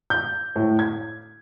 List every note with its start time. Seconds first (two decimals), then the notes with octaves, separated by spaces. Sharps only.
0.10 G6
0.56 A2
0.79 G#6